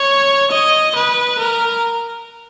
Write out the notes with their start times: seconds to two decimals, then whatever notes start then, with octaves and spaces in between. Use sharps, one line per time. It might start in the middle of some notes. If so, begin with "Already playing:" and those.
Already playing: C#5
0.52 D#5
0.95 B4
1.39 A#4